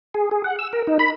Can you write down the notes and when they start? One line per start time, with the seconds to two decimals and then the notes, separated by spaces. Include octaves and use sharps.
0.14 G#4
0.31 G#4
0.44 F#5
0.59 E6
0.73 A#4
0.87 D#4
0.99 B5